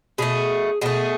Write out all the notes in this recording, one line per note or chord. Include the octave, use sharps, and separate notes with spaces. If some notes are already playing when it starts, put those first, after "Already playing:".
B2 A3 G#4
B2 A3 G#4